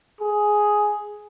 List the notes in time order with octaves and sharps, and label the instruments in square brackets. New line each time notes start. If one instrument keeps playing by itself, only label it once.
[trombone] G#4